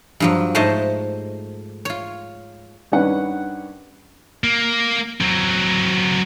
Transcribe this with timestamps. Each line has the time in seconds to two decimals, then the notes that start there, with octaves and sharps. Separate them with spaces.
0.20 G2 F3 F#3
0.55 G#2 A3 C5 C#5 D#5 A5
1.85 F4 C#5
2.92 G2 D#3 G3 C#4 B4 F#5
4.44 A#3
5.21 F#3 C4